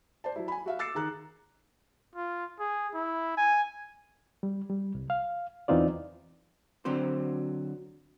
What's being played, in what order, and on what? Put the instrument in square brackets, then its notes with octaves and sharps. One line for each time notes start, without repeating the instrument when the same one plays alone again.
[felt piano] C5 D5 A5
F#3 E4
G#5 B5
F#4 E5 F5
D6 E6 A6 C7 C#7 E7
D#3 G#4 A#5 F#6
[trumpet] F4
G#4
E4
G#5
[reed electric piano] G3
G3
C2
F5
E2 E3 C4 D#4 F4 D5
[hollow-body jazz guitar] D3 F#3 C4 C5